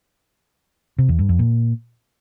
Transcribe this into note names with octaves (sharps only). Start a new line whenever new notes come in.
C3
E2
G2
F2
A#2